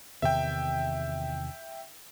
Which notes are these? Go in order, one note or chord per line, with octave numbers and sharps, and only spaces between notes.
E2 C3 D#3 E5 G5